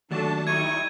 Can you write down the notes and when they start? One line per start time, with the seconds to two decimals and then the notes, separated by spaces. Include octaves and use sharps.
0.11 D#2 F#3 A3 D4 F#4 A4 A5
0.47 G3 D#4 E4 C#6 G#6 D#7